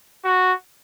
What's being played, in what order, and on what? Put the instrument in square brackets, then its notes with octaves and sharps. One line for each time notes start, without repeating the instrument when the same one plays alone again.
[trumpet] F#4